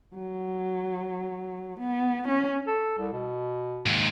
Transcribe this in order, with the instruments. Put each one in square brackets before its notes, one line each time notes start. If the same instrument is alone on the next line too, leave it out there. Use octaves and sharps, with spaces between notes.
[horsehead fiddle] F#3
B3
C#4
[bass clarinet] A4
C2
B2
[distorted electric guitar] D#2 G#2